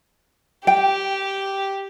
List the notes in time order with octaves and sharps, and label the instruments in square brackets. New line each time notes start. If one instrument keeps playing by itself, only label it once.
[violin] G4 [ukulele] G5